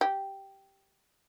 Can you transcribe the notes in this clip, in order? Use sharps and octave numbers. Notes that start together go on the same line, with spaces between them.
G4